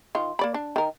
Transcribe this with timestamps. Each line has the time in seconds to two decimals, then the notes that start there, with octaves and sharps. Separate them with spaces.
0.15 D#3 F4
0.39 A#3 D5 B5
0.54 D4
0.76 D#3 A#4